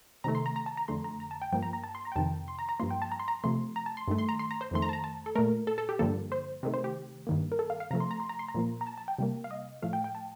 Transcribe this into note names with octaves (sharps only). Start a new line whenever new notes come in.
C3 D#3 A3 A#5
C6
A#5
A#5
A5
A#5
F2 D3 A3 C6
A#5
A#5
A5
G5
G2 F3 A#3 G5
A#5
A#5
A5
C6
A#5
G5
F2 C3 D#3 A5
C6
A#5
A#5
G2 F3 A#3 C6
G5
A5
A#5
C6
A#5
C3 F3 A3 C6
A#5
A5
C6
G2 D#3 A3
C6
A#5
C6
A#5
C5
F2 D#3 A3 C6
A#5
A5
A#5
A5
A4
A#2 A3 A#4
A4
A4
G4
G2 D3 F3 A#3 A4
C5
C3 D#3 A3
C5
G4
G2 D#3 A#3
A#4
A4
F5
F5
C3 F3 A3 A#5
C6
A#5
C6
A#5
C6
A#5
A#2 F3 A#3
A#5
A5
A5
G5
C3 G3 A#3
F5
D#5
A2 F3 A3 F5
G5
G5
A5